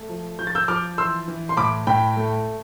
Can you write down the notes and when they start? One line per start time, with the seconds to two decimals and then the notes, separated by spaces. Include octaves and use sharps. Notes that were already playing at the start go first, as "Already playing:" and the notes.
Already playing: A3
0.09 F3
0.39 F3 G6
0.47 A6
0.55 E6 G6
0.68 F3 D6 F6
0.98 E3 C6 E6
1.28 E3
1.49 C6
1.57 A2 B5 D6
1.87 A2 G5 B5
2.17 A3